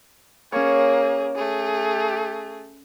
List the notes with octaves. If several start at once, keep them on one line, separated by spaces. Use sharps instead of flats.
A#3 C#4 G#4 C#5
A3 G#4